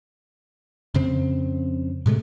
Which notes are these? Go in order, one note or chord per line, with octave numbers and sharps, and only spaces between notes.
F2 C#3 C4
A2 C3 G#3 A3